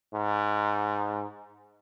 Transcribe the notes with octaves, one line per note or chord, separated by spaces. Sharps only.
G#2